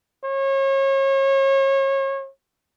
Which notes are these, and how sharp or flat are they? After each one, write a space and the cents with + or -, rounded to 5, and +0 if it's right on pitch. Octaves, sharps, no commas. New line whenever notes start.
C#5 -35